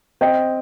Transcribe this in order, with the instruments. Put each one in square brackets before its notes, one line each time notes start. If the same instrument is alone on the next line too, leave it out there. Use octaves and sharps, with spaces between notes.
[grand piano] C4 D#5 G5